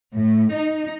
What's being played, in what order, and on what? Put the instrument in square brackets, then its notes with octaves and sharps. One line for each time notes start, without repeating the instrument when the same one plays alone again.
[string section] A2
D#4